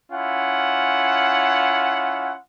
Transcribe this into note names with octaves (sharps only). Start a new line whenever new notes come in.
C#4 E4 F4 F#5